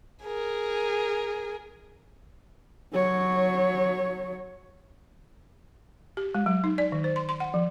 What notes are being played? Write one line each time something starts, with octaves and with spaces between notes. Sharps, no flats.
G#4 A#4
F#3 C#5
G4
G#3
F#3
D#4
D5
D#3
C5
C6
C6
F#5
F3